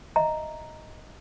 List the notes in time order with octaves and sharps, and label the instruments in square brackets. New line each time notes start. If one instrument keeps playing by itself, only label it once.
[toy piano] D#5 E5 A#5